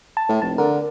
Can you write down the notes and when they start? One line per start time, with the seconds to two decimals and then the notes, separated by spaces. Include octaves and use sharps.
0.17 A5
0.29 A2
0.42 F1 A5
0.58 D3 A#4